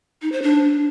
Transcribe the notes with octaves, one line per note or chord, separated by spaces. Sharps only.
D#4
C5
D4